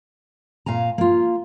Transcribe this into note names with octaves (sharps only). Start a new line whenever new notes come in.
A#2 F5 G#5 A#5
A#3 F4